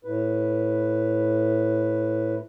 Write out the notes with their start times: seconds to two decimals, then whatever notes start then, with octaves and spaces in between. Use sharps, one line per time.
0.04 A2 B4